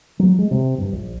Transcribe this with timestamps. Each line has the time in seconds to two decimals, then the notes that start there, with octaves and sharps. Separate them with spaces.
0.19 F#3
0.39 G#3
0.51 C3
0.78 G2
0.92 A#1